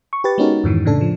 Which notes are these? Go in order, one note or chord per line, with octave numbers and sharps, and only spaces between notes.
C#6
G4 B4 A6
G#3 B3 C#4 D#4 F#4 A#4
F2 G#2 D#3 E3
A2 C#3 D4 A4
F3